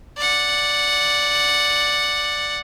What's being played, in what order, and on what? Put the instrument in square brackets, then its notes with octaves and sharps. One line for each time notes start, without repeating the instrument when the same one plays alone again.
[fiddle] D5 F#5